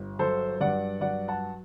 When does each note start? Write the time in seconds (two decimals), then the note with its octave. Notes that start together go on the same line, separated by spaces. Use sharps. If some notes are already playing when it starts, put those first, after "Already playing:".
Already playing: G1
0.19 F#3 A4 C5
0.61 G2 D5 F#5
1.00 F#3 D5 F#5
1.28 F#5 A5